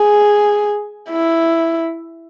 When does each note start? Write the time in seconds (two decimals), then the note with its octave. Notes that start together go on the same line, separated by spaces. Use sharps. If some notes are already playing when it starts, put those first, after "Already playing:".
Already playing: G#4
1.11 E4